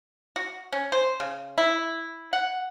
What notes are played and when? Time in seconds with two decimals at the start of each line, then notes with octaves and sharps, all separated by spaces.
0.36 F#4
0.72 C#4
0.92 C5
1.20 C#3
1.58 E4
2.33 F#5